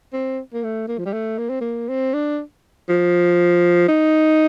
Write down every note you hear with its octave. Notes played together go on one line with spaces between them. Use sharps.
C4
A#3
A3
A#3
F3
G3
A3
A#3
C4
A#3
C4
D4
F3
D#4